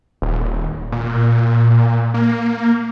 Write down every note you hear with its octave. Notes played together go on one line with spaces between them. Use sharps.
D#1
A#2
A#3